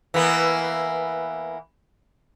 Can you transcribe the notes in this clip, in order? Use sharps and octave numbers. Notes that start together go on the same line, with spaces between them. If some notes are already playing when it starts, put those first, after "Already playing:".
E3 A#3 B3